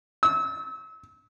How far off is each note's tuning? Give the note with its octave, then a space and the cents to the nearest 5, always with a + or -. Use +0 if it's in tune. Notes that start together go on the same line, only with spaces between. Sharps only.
E6 -35